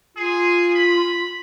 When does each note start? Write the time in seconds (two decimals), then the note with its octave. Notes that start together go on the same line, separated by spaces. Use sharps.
0.17 F4 G#4
0.75 B5